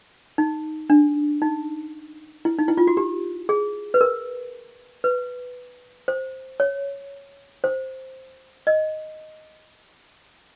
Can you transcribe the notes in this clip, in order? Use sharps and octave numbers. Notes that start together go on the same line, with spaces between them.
D#4
D4
D#4
E4
D#4
E4
F4
F#4
G4
G#4
B4
A#4
B4
C5
C#5
C5
D#5